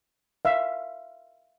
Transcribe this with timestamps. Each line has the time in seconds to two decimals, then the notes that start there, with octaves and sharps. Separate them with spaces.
0.45 E5 F5